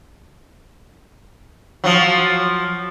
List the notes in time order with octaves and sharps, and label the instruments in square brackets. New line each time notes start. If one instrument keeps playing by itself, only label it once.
[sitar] F3 F#3